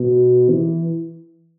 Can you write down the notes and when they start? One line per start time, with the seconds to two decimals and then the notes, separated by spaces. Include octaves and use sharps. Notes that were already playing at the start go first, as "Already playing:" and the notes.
Already playing: B2
0.50 E3